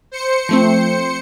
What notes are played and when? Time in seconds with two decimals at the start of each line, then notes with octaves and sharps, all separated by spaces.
0.11 C5 C#7
0.49 F3 A3 C4